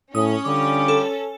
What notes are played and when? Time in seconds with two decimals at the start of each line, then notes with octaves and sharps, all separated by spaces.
0.15 A2 C#4 D#6
0.46 D3 G3 F4 D6
0.88 A4